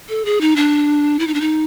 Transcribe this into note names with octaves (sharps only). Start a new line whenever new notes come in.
A4
G#4
D#4
D4
E4
D#4
D4
D#4